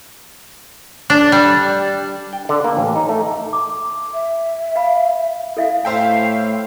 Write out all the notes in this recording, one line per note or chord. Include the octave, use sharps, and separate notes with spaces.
D4
G3
G5
D3
A#3
A1
D#4
A3
D6
E5
F5 B5
E4 A4 E5 F5
A2 C5 E5 F5 G5